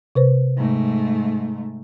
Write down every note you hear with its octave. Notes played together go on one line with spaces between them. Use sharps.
C3 B4 C5
G#2 A3